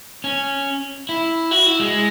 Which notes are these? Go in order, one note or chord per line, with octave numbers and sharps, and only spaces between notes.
C#4
E4
F#4
E4
G#3